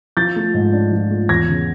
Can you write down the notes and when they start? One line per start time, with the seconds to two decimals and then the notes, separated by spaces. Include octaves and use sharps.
0.17 F3 G6 A6
0.36 A3
0.54 G#2
0.73 D4
0.92 F3
1.11 A3
1.29 E2 G#6 A#6
1.48 C#3